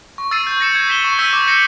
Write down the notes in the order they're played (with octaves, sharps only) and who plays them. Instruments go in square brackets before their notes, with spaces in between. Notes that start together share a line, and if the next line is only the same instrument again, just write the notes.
[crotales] C#6
E6 A6 C7 D#7
G6
A#6 C#7 E7
G#6
B6 E7 G7
C#6
E6 G6 B6 D#7
D6
G6 A#6 C#7